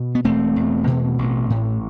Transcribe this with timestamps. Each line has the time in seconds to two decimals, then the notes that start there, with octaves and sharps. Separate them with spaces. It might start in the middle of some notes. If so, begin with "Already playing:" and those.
Already playing: B2
0.15 B3
0.24 E1 A3 C4
0.56 E2
0.87 B2
1.19 A1
1.50 A2